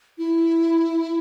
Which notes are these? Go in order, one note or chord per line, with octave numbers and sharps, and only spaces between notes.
E4